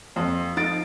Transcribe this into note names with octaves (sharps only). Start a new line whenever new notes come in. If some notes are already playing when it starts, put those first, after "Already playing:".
F2
F3 D#4 A6 D7